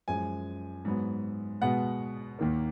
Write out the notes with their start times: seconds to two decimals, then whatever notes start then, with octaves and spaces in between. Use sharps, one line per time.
0.08 F#2 F3 G#3 G#5
0.85 G#2 F#3 B3
1.61 B2 G#3 B3 F#5
2.39 D#2 D#3 A#3